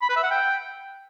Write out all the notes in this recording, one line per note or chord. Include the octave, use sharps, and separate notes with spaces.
B5
B4
E5
F#5
G5